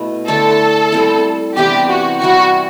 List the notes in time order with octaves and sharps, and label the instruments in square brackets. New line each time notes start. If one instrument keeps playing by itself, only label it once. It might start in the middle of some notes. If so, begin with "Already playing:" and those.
Already playing: [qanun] B2 A3 E4
[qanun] D3 A3 E4 [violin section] A4
[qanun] G3 C4 E4
[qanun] C3 E3 B3 D4 [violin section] G4
[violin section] F#4
[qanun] G3 C4 E4 [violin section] F#4